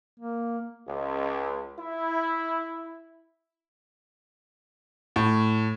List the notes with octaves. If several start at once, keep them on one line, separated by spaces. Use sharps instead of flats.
A#3
C#2
E4
A2